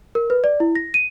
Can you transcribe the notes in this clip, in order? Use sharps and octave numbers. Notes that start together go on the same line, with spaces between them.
A#4
B4
D5
E4
A#6
D#7